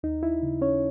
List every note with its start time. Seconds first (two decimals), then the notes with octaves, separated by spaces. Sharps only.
0.03 D#2 D#4
0.23 E4
0.43 C#3
0.61 C#4 C#5